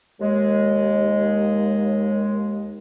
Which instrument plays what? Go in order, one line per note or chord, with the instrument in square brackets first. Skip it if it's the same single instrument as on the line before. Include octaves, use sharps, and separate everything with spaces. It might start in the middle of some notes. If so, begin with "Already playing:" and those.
[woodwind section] D#2 G#3